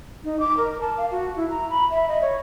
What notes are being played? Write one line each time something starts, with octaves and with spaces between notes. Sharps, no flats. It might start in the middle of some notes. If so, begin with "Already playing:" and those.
D#4
D6
A#4
A5
F5
F#4
E4
A#5
B5
E5
D#5
C#5